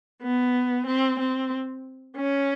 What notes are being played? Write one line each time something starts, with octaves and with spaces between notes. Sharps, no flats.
B3
C4
C4
C#4